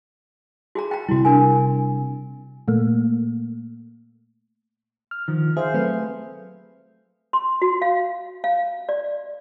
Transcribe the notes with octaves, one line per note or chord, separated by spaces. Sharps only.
F#4 G#4 A#5
G5 A#5
C3 G3 E4 F#4
D4 A#4 G#5
A#2 A3 A#3
F6
D#3 F3
G#4 C5 E5 F5
F#3 A3 C4 B4
C6
F#4
F5
F5
D5